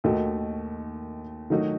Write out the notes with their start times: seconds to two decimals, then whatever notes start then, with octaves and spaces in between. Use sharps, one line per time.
0.04 D#2 D#3 A3 D#4 F#4
1.50 D#3 F#3 A3 D#4 F#4